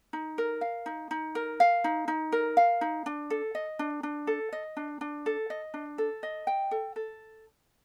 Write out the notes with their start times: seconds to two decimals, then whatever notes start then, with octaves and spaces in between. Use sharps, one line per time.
0.13 D#4
0.38 A#4
0.61 F5
0.86 D#4
1.11 D#4
1.35 A#4
1.60 F5
1.84 D#4
2.08 D#4
2.32 A#4
2.57 F5
2.81 D#4
3.06 D4
3.30 A4
3.55 D#5
3.79 D4
4.03 D4
4.27 A4
4.53 D#5
4.77 D4
5.01 D4
5.26 A4
5.50 D#5
5.74 D4
5.98 A4
6.23 D#5
6.47 G5
6.71 A4
6.96 A4